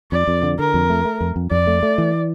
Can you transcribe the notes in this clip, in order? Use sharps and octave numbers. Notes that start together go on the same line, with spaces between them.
F2 D5
F2
D3
D3 A#4
F2
A3
A3
F2
F2
F2 D5
A3
A3
E3